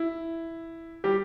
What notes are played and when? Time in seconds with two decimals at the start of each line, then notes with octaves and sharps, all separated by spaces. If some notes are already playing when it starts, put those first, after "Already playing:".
Already playing: E4
1.04 G3 G4